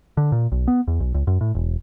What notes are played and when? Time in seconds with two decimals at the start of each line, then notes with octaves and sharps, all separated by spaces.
0.17 D3
0.32 A#2
0.52 B1
0.68 B3
0.88 E2
1.00 B1
1.14 C#2
1.27 F#2
1.41 A2
1.55 E1